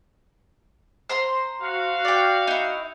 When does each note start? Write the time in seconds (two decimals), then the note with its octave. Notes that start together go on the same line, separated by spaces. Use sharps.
1.09 C5 A#5 C6
1.61 F#4 F5
2.05 D5 G5
2.47 D#4 E4